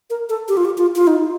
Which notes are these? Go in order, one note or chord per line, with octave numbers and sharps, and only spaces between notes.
A#4
A4
G4
F4
G4
F4
F4
D#4